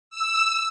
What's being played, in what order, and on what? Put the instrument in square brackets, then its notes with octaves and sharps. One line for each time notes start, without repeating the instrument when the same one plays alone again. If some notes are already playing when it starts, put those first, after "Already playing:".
[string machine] E6